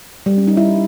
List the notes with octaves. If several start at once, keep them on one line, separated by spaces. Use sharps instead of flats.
G3
C#4
D#4
E4